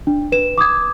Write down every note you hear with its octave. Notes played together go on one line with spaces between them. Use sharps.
D4
B4 E7
D6 D#6 G#6